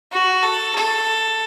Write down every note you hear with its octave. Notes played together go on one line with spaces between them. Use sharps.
F#4
A4
A4